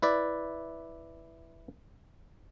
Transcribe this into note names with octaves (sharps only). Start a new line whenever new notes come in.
E4 B4 D5